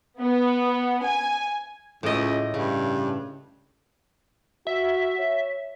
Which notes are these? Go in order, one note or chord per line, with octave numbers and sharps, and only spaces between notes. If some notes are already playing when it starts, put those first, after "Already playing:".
B3
G#5
C#2 A2 D#5
G2 C#3
F#4 E5
C#5